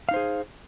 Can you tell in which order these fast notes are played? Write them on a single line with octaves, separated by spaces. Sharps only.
F5 D#4 C5 G#4